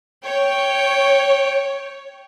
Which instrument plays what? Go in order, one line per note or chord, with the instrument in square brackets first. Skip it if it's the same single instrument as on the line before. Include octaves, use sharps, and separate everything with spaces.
[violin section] C#5 [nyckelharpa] G5